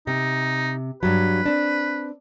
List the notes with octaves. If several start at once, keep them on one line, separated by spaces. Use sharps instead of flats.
C3 D#4
G2 F#3 B4
C4 D4